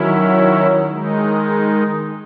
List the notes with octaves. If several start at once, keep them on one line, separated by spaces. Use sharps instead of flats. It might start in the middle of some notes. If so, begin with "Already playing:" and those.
Already playing: D#3 F#3 C#4 E4
D#3 G#3 D#4